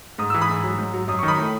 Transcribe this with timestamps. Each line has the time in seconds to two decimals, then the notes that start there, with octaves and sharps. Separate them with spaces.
0.18 G#2 D#6
0.30 E3 E6
0.41 B5 D#6
0.49 G#2
0.63 F#3
0.78 G#2
0.93 F#3
1.08 F#2 D#6
1.19 D#3 C#6
1.28 B5 D#6
1.38 A2